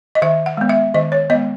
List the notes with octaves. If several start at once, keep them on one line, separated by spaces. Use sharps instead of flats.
D#5
D#3 E5
F#5
G#3 B3
E5
D#3 D#5
C#5
G#3 B3 D#5